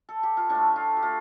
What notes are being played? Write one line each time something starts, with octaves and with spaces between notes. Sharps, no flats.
A4
G4
F4
A2 D4
A3
F4
G4
A3 F4